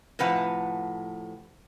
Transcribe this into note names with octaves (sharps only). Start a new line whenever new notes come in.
A2 C3 F3 B4 F#5